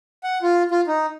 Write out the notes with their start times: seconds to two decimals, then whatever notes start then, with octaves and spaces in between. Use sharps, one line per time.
0.24 F#5
0.42 F4
0.71 F4
0.87 D#4